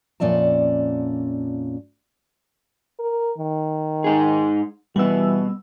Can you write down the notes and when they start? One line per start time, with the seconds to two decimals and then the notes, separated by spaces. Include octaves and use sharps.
0.20 F2 A#2 C#4 D5 E5 A5
2.99 A#4
3.38 D#3
4.04 G#2 D#4 G#4
4.96 B2 E3 G3 B3 E6